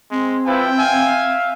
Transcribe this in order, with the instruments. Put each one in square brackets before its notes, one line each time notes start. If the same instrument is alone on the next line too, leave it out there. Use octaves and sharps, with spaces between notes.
[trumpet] G#3 [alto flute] C4
[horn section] F3 E4 A5 [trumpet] B4 [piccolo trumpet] G5
[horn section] E5 F5 [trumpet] G#5